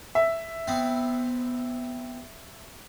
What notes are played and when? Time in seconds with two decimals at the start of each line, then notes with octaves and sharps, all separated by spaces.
0.15 E5
0.68 B3 C4